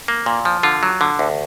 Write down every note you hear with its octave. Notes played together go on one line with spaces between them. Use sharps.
A#3
A#2
F3
D3 F4
F#3
D3
D2